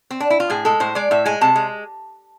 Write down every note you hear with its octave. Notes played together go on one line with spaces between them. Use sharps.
C4
D4
E4
F4
A2 G#4
G#3 A4
A2 C5
G#3 D5
A2 E5
G#3 G#5
C3 A5
G#3